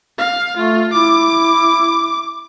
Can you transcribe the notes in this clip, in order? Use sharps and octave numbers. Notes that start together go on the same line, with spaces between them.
F5
A3 F4
E4 D6